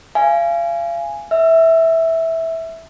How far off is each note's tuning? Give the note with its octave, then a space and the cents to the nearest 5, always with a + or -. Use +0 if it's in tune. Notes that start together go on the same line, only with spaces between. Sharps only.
F5 -35 G#5 +0
E5 -10 E6 +40